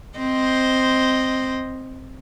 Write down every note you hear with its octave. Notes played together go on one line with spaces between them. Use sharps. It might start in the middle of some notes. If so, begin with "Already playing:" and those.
C4 C5 D#5